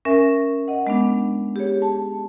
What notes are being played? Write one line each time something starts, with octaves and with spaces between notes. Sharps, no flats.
C#4 A#4 E5 G#5
D#5 F#5
G#3 B3 D4
G4 G#4 C#5
A5